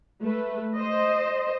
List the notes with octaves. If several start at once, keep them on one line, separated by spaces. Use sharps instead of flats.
A3 B4
C5 D#5